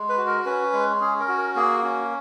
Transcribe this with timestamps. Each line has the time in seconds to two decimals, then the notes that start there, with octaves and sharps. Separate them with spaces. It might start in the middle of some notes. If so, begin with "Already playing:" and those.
Already playing: G#3
0.09 B4
0.17 F#4
0.26 A#4
0.46 C#4 B4
0.73 G#3
1.00 C#4 G#4
1.20 A#4
1.28 F#4
1.38 A#4
1.56 A#3 G#4
1.83 C#4 F#4